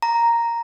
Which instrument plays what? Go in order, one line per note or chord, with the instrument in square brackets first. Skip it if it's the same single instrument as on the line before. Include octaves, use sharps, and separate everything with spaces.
[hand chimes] A#5